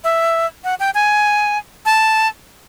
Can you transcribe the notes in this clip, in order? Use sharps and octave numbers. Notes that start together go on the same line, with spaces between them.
E5
F#5
G5
G#5
A5